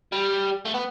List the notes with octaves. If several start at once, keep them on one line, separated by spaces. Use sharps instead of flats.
G3
A3
B3